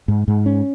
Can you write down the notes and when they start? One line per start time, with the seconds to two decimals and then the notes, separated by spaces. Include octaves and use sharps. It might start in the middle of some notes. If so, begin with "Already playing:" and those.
0.08 G#2
0.28 G#2
0.46 C#4